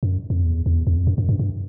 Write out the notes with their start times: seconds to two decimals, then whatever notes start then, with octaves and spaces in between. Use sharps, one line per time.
0.03 F#2
0.30 F2
0.44 E2
0.66 E2
0.87 E2
0.96 F2
1.07 F#2
1.18 F#2
1.29 G2
1.39 G2